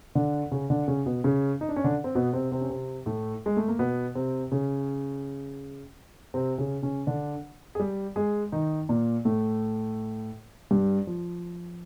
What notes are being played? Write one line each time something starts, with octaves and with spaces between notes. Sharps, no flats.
D3 D4
C#3 C#4
D3 D4
C#3 C#4
B2 B3
C#3 C#4
D#4
D4
C#4
D3 D4
C4
B2 B3
C3 C4
C3 C4
C#4
C3 C4
A2 A3
G#3
A3
A#3
B2 B3
C3 C4
C#3 C#4
C3 C4
C#3 C#4
C#3 C#4
D3 D4
G#4
G3 G4
G#3 G#4
D#3 D#4
A#2 A#3
A2 A3
G2 G3
F3